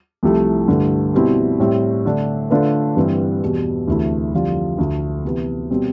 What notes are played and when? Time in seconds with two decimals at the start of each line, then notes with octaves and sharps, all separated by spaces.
0.23 C2 C3 F3 A3 E4
0.68 G2 D3 A3
1.14 B2 G3 C4 E4
1.60 A2 G3 C4
2.06 D3 A3 D4
2.50 D3 A3 D4 F4 B4
2.97 G2 E3 G3 C4
3.43 E2 B2 G3
3.88 D2 C3 E3 A3 E4
4.34 F2 D3 G3 D4 F4
4.78 D2 D3 A3
5.24 C3 E3 B3
5.71 B2 G3 C4